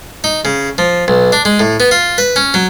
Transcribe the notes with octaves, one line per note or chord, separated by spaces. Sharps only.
D#4
C#3
F3
B1
D4
G#3
A2
B3
F4
B4
C#4
F#3